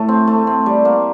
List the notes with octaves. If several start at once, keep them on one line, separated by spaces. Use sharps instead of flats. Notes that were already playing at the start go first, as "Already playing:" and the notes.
Already playing: A2 A3
C4
A3
C4
G3
A#3